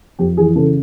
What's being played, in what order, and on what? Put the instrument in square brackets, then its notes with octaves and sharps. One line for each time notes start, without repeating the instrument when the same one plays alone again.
[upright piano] F2 G4
E3 G#4
C#3 A4